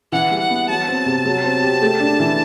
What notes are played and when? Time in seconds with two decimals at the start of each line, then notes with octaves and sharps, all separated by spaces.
0.12 E3 F#5
0.31 G3
0.40 F#5
0.50 B3
0.69 F#3 A5
0.88 C4
1.06 C3
1.26 F#3
1.44 C4
1.63 G4
1.81 A3
2.00 D4
2.20 E3